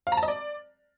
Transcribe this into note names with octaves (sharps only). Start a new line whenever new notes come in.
F5
A#5
A5
D#5
D5